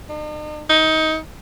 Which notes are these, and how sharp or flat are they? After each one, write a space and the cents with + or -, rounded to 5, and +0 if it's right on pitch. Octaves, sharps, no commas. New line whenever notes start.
D#4 -45
D#4 +20